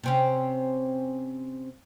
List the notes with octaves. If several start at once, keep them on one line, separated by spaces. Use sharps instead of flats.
C3 C4 C#4